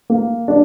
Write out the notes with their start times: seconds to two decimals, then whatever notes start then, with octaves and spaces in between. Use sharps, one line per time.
0.10 A#3
0.48 D4